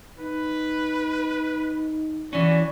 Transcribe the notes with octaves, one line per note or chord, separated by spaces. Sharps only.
D#4 B4
E3 C#4 F#4 D5